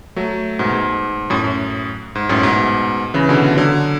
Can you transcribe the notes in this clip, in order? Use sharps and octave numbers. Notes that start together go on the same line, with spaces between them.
F#3 A3
G#2 B2
G#2
F#2 A2
F#2
G#2
F#2 A2
G#2 B2
C#3 E3
B2 D3
D3 F#3